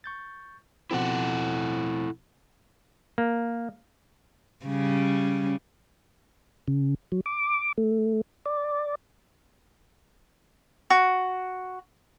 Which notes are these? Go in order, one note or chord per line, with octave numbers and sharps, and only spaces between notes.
C#6 G6 A6
B2 F3 C4 E4 A4 F#5
A#3
C#3 G3 C#4
C#3
F#3
D6
A3
D5
F#4